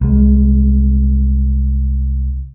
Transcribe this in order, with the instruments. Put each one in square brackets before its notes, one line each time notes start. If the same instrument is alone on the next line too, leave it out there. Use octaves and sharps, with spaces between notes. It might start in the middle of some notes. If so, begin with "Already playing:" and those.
[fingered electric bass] C2 G#3